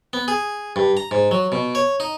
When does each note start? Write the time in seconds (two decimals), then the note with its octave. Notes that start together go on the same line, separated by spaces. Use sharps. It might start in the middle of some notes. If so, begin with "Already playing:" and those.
0.13 B3
0.28 G#4
0.76 G2
0.97 A#5
1.11 G#2
1.31 F#3
1.52 B2
1.75 C#5
2.00 D#4